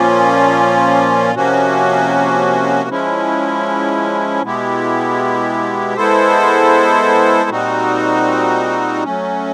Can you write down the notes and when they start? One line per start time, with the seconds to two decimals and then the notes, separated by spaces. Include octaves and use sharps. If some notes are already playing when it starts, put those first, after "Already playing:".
Already playing: A#2 F3 A#3 C#4 F4
1.35 C3 F3 A#3 C#4 F#4
2.89 F3 G#3 C#4 E4
4.43 B2 G#3 B3 E4 G4
5.96 G#3 B3 E4 A4 C5
7.50 A#2 G3 C4 D#4 F#4
9.04 F#3 A3 C#4